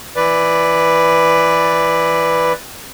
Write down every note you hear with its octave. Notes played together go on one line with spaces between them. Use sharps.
E3 B4 D5